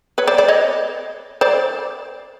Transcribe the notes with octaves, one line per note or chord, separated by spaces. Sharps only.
B4 C#5
C5 D5
C5 D5
C#5 D#5
C5 D5